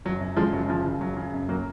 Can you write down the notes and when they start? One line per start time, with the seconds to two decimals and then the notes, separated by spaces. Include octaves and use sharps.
0.05 F#1 F#3
0.21 F#2
0.37 C#3 F3 G#3
0.53 F#1 F#3
0.68 C#3 F3
0.85 C#3
1.01 F#1 F#3
1.17 C#3
1.33 F#2
1.49 F#3 A#3